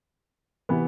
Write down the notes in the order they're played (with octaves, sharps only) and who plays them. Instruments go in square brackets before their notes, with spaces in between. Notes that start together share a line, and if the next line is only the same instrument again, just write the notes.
[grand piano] C3 E3 B3